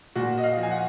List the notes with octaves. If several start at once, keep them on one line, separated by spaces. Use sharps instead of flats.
A#2 F#4
D#5
F5
F3
G#5
F#5